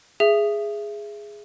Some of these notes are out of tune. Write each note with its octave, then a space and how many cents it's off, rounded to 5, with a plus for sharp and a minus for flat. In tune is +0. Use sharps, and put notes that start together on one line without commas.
G#4 +0 E5 +25